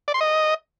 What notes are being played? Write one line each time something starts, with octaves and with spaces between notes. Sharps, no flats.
D5
C6
D#5